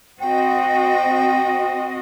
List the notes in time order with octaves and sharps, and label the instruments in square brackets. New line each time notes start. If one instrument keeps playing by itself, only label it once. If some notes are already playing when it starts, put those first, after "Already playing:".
[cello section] C4 F#4 D#5 [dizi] G5